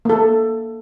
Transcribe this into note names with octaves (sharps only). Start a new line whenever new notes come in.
A#3 A4